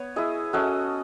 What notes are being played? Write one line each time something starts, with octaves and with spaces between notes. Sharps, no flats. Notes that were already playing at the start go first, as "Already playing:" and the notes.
Already playing: B3 C#5
E4 G#4 D#5
C#4 F#4 A4 D#5